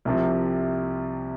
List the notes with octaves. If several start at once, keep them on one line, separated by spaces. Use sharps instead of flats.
C2 C3 F3